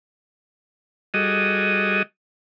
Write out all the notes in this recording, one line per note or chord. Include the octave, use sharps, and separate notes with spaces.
G3 F#4 G#4 A4 D#5